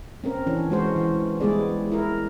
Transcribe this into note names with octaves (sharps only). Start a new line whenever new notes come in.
C4 C#4 A#4
E3 C#4 D4
E3 G#3 F#4 C5
E3
G3 G#3 B3 E4 G#4 D5
E4 A#4